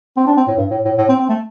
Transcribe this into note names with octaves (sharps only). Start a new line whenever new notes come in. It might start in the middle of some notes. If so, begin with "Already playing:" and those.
C4
D4
C4
A2
G2
A2
A2
A2
C4
C4
A3